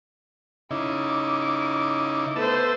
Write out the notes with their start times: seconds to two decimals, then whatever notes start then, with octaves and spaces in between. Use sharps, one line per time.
0.71 C#3 D#4 E4 D6
2.36 A3 B3 C5 A5 E6